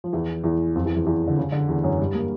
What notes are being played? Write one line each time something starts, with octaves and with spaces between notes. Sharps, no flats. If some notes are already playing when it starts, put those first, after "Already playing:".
F3
E2 E3
E2 E3
F2 F3
E2 E3
E2 E3
E2 E3
D3
C#3
D3
E2 E3
F#2 F#3
G2 G3
A#3